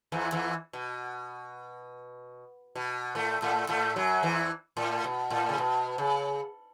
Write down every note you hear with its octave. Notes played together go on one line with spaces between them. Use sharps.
E2 E3
E2 E3
B2
B2
A2 A3
A2 A3
A2 A3
F#2 F#3
E2 E3
A2
B2
A2
C#3
B2
C#3